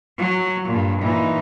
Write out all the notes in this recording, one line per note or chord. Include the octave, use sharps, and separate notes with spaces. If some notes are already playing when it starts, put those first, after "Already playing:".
F#3
G2 A#2
A#2 E3 D#4